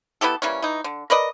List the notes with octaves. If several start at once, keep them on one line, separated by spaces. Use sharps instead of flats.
B3 E4 G4 A4
E3 G3 A#3 C#4
E3 D#4
D3
A#4 B4 D5 D#5